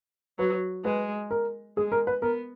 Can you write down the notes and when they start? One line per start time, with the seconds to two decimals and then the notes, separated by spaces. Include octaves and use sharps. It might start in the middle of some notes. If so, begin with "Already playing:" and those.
0.39 F#3 B4
0.84 G#3 B4
1.31 A#4
1.77 G#3 G#4
1.92 A#4
2.07 B4
2.22 B3 A#4